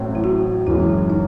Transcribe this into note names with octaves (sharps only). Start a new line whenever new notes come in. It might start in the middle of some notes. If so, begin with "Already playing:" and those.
Already playing: A1 A2 F#3 C4
E4
F#4
F#1 F#2 E3 G#3 E4
D#4